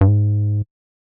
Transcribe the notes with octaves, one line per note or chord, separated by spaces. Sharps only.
G2
G#2